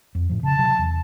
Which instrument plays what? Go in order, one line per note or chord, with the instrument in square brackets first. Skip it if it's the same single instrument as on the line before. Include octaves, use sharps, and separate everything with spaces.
[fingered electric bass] F2
A2 F3
[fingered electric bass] C#3 [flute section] A5
[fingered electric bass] C3 F#3
E2